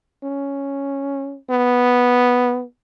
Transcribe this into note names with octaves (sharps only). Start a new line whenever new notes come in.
C#4
B3